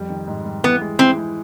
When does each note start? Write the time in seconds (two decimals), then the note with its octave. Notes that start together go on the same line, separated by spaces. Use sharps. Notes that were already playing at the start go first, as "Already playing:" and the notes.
Already playing: F2 G3
0.10 D#3
0.28 G#2
0.45 G3
0.64 E3 B3
0.81 G#3
0.99 E3 C4
1.18 G#3